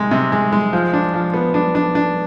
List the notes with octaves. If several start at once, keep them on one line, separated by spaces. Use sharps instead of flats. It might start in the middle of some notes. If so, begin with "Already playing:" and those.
Already playing: C3 G#3
C3
G#3
G#3
F3
D4
F3
B3
D4
D4
D4